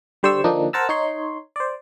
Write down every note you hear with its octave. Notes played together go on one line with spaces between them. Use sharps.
D3 G3 C5 D5 C#6 E6
D3 F3 A#3 D4 D#4
A#4 C5 F#5 A5 A#5 E6
D#4 C#5 C6
C5 D5